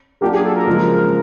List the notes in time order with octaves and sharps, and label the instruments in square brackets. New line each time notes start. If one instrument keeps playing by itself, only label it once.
[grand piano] F#3 A#3 D4 F4 [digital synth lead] G4
[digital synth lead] G#4
A4
A#4
[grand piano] C#3 F3 G#3